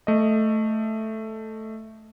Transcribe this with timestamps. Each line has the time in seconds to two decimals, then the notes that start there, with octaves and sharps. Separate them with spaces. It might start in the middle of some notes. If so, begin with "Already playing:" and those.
0.07 A3 D#5